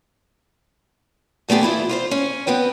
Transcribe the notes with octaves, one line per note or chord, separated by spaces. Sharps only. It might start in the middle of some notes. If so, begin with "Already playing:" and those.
A#2 A3 B3 G4 G#4
E3 B3 E4 F4
F4 B4 C5
C#4
B3 C4 B4 G5